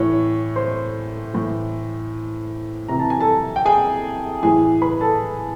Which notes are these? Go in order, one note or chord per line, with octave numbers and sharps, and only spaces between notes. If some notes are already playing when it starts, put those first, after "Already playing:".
Already playing: A2 E3 C#5
C5 C6
A2 E3
C3 E3 A#5
A5
G#5
A4 A5
G5
G#4 G#5
A2 E3 G#4 G#5
B4 B5
A4 A5